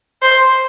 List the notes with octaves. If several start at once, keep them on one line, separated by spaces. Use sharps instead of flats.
C5